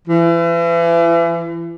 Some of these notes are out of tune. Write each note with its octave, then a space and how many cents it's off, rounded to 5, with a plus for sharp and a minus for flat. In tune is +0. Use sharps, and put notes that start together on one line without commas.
E3 +35